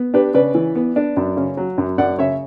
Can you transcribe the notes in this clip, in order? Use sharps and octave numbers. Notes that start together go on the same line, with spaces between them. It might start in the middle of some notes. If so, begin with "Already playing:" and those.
Already playing: B3
D4 G4 B4
C#3 B4 D5
E3
B3
D4
F#2
C#3
F#3
F#2
F#2 D5 F#5
C#3 C#5 E5